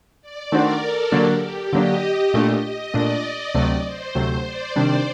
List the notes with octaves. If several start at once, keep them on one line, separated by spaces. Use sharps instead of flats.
D5
D#3 A3 D4 F#4 A#4 C5
A4
D3 F#3 A#3 D4 G4
G4
D3 F#3 A#3 D4 D#5
A#2 A3 D4
D#5
A#2 A3 D4 D5
D2 C3 F#3 A3 D5
C5
D2 C3 F#3 A3 C5
D5
C3 D#3 G3 D4